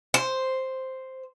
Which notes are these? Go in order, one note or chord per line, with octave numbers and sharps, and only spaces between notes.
C5